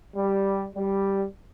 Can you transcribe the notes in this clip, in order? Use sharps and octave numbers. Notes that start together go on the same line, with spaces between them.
G3
G3